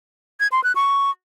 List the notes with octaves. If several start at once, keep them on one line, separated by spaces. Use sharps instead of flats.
G#6
C6
F#6
C#6